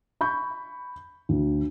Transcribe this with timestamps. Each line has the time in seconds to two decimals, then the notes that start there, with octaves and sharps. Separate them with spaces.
0.21 B5 C#6 G6
1.29 D2